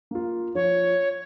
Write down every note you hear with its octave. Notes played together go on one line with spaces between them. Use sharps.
A#3 F4
F3 C#5